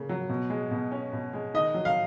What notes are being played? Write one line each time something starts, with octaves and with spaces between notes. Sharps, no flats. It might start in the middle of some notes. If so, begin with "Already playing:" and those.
Already playing: C#3 A#3
F#3
B2
G#3
B2
C#4
B2
G#3
D#3 D#5
F#3
F5